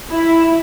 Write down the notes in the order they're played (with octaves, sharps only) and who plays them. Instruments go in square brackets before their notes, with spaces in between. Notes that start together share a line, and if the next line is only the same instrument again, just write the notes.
[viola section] E4